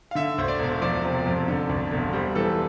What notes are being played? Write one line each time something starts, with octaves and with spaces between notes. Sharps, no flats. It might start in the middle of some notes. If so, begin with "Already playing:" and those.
F5
D3 E5
D2 C5
D5
E1
F3 D5
C3
F2
D3
D2
E1
G3 C5
E3 A4